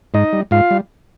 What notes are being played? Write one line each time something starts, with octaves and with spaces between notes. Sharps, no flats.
G#2 D#4 D#5
G3
G#2 F4 F5
G3